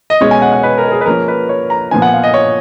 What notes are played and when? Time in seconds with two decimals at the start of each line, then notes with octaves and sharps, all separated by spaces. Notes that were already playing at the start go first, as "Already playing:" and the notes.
0.10 D#5
0.21 B2 G#3 C#4 C#5
0.31 G#5
0.42 F#5
0.53 F#5
0.63 B4
0.78 A#4
0.88 A#4
0.92 G#4
1.01 B4
1.06 F3 A#3 C#4 A#4
1.28 B4
1.49 C#5
1.70 A#5
1.91 A#2 F3 B3 G#5
2.02 F#5
2.13 F5
2.23 D#5
2.34 C#5